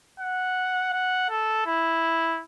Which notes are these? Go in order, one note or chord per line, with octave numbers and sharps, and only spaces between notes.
F#5
F#5
A4
E4